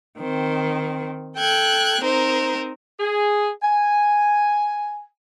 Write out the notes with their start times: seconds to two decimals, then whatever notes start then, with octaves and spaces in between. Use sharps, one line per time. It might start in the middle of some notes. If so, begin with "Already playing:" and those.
0.20 D#3 C4
1.38 A4 G5 F#6 G#6
2.02 C4 D#4 A#4 C5
2.99 G#4
3.62 G#5